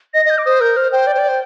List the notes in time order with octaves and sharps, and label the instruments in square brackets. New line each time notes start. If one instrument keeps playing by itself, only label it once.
[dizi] D#5 [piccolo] A#6
[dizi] D#5 [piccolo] G6
[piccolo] D6
[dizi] C5 [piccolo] D#6
[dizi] A#4 [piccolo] G6
[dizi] C5 [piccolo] F6
[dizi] C5 [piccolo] G5
[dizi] D5
C5
D5
C5